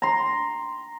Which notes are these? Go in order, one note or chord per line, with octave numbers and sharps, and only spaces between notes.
A#5 C6